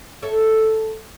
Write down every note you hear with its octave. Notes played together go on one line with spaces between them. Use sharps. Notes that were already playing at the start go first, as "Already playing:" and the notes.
A4 C#5 E5